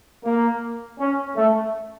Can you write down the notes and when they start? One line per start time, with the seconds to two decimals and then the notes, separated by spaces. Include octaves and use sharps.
0.25 A#3
0.99 C#4
1.36 A3